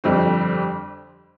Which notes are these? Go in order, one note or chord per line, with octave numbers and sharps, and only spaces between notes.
G1 F2 D3 G3 C4